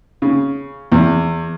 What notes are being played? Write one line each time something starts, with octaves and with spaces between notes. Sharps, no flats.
C#3
E2